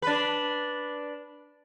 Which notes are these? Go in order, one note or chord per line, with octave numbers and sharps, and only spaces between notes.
D4 B4